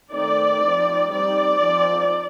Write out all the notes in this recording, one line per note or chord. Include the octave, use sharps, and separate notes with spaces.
D#3 A3 C4 D#4 D5
F3 C4 D#4
G3 C4 D#4 D5
F3 C4 D#4